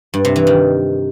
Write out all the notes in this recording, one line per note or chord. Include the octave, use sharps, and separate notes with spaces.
G2
C3
E3
D#3